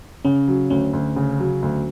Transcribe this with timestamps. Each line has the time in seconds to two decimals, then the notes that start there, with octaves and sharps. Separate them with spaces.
0.25 C#3 C#4
0.48 F#3
0.70 D2 C#4
0.93 D2
1.16 C#3
1.39 F#3
1.62 D2